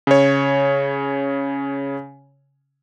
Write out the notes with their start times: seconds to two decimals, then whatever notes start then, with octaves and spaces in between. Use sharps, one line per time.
0.07 C#3 C#5